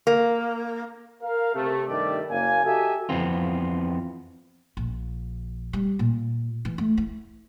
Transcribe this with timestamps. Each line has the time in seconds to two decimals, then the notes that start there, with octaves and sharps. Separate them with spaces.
0.07 A#3
1.23 A#4 F5
1.54 C3 A3
1.88 G2 C3 D#3 G3 A3 D5
2.30 F#1 A#3 F5 G#5
2.65 F#4 G4 A4 D#5 E5 G#5
3.09 F2 E3 B3 C4 F4
4.77 A#1
5.73 G3
5.99 A#2
6.65 E3
6.78 A3
6.98 E4